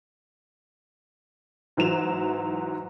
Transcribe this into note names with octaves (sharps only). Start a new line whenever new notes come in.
G#2 E3 F#3 E7 F7